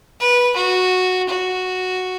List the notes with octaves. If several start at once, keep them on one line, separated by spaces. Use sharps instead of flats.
B4
F#4
F#4